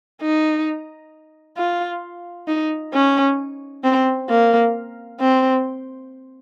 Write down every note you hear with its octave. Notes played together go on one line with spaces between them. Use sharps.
D#4
F4
D#4
C#4
C4
A#3
C4